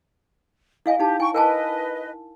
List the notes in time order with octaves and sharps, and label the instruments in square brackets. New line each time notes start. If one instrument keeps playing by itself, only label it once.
[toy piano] E4 F5 G#5 [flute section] D#5
[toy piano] D#4 A5 [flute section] G4
[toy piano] E4 G#5 [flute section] G5 C#6
[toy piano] A#4 G#5 A5 [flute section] B4 D#5